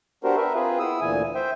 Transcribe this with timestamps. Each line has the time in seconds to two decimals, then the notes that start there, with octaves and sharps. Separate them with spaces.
0.24 B3 D4 F#4 G4 A#4 C5
0.36 A#4 B4 E5
0.55 C4 F4 G#4 B4
0.79 B3 E4 D#6 E6
1.01 D2 A#2 E3 G#5
1.35 C5 E5 G5